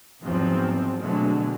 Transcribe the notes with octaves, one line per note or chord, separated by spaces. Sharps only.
E2 G#2 F3 F#3 C4
B2 D3 F#3 G#3 A3